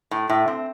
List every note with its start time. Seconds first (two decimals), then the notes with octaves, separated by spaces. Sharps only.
0.11 A2
0.29 A2
0.48 C4